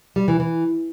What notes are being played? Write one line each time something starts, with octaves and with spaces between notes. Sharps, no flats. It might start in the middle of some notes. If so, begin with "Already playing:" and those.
G3
E3
E3